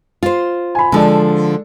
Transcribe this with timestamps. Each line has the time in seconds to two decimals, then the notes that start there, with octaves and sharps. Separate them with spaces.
0.23 F4 C5
0.75 G#5 B5
0.92 D3 F3 G#3 A4 D5